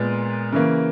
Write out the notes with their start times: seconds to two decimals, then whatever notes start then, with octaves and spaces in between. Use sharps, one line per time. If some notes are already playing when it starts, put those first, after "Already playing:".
Already playing: A#2 G#3 B3
0.53 C#3 E3 A#3